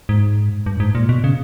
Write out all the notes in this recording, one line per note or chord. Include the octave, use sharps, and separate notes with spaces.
G#2
G2
G#2
A#2
B2
C#3